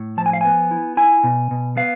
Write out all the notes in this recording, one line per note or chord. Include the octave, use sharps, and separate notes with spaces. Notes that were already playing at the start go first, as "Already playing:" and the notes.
Already playing: A2
F3 A5
G#5
F5
B3 G#5
E4
E4 G#5
B2
B2
B3 F5